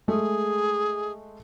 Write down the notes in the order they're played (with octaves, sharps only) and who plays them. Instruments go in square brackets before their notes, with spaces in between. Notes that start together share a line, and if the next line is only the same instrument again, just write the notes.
[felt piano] G#3 A3 [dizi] G#4